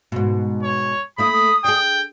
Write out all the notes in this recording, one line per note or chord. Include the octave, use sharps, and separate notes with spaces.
G#2 B2
C#5
A3 A#3 E4 B5 D#6
D4 G#4 G5